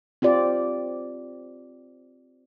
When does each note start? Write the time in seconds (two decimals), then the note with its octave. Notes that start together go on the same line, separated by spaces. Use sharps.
0.22 C4 F4 G4 D5